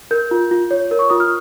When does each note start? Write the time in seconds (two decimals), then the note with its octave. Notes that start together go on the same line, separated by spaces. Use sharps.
0.11 A#4 G6
0.31 F4
0.51 F4
0.71 C#5
0.91 A#4
0.99 C#6
1.10 F4 D#6
1.20 F6